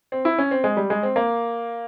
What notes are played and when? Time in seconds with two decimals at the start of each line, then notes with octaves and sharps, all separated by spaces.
0.12 C4
0.25 E4
0.38 C#4
0.51 C4
0.64 G#3
0.77 G3
0.90 G#3
1.03 C4
1.16 A#3